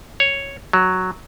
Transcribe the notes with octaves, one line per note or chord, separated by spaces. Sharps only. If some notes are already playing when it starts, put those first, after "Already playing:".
C#5
F#3